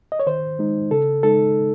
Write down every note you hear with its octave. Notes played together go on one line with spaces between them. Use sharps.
D#5
C#5
D#3 C5
G#3 D#4
C#3 A4
G#3 D#4 A4